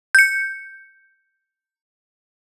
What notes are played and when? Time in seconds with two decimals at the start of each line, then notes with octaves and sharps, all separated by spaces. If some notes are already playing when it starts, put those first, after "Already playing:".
0.15 G6 C#7